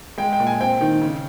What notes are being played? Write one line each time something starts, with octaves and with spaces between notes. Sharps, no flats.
G#3 G5
G5
A#2
G#5
C4 G5
D#3
C#3